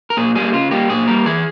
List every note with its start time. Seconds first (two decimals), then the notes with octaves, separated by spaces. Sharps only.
0.10 A#4
0.17 A#2 G#4
0.35 G3 A#3 G#4
0.53 C#3 F4
0.71 G3 A#3 G4
0.89 A#2 G#4
1.07 G3 A#3 A#4
1.26 E3 G#4